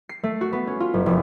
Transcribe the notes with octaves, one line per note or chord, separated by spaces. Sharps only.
C7
A3
F#4
B3
C#4
F4
F#1
F1